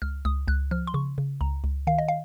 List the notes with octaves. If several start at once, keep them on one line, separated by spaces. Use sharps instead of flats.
C#2 F6
C#2 D#6
C#2 F#6
F3 F6
C6
C#3 C#6
C#3
C#2 A#5
C#2
D#3 F5
D#5
F5